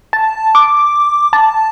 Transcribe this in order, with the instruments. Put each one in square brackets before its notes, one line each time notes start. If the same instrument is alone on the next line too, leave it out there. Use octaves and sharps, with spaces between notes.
[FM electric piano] A5
D6
A5